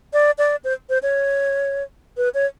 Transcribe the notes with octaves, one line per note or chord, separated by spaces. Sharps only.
D5
D5
C5
C5
C#5
B4
C#5